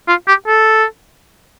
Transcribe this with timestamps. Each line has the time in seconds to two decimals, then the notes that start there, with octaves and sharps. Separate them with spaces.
0.08 F4
0.28 G4
0.48 A4